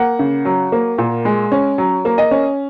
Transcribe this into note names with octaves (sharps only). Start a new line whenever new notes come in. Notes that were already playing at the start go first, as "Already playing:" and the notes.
Already playing: A#3 F#5
C#3
F#3
A#3
A#2
G#3
C#4
F#3
A#3
D#5
C#4